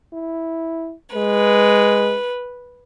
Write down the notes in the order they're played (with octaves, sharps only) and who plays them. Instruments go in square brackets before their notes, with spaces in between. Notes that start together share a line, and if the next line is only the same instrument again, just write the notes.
[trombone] E4
[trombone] G#3 [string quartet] B4